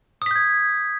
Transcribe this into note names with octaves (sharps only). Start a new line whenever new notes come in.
D#6 G6 G#6 B6